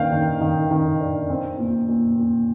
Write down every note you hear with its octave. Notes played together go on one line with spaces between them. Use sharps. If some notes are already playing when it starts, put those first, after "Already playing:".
Already playing: D#3 A#3 D4 F5 G5
D#3
D#3
D#3
D4
C4
A#2
A#2
A#2